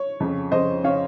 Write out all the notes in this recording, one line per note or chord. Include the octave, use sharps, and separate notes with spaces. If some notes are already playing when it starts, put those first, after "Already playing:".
Already playing: C#5
F2 C#3
F2 C#3 C5 D#5
C#3 C#5 F5